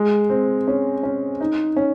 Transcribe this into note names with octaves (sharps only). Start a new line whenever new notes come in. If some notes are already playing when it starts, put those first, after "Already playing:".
Already playing: G#3
C4
C#4
C#4
D#4
C#4